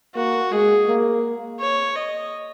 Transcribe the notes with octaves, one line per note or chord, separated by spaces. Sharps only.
A#3 F#4
G#3 G#4
A#3
C#5
D#5